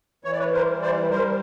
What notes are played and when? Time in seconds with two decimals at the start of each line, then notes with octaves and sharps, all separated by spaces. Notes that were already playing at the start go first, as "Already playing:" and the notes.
0.24 E3 C#5
0.32 D5
0.39 B4 C#5
0.54 A#4 C5
0.68 G3
0.82 C5 D5
1.10 G3 A#4 C5